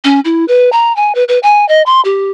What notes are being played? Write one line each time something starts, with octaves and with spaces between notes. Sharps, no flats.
C#4
E4
B4
A#5
G#5
B4
B4
G#5
D#5
C6
G4